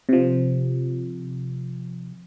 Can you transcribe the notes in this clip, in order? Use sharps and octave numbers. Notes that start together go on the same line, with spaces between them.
C3 F3